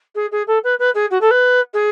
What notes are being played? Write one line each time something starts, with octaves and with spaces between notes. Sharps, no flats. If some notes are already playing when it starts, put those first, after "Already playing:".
G#4
G#4
A4
B4
B4
G#4
F#4
A4
B4
G#4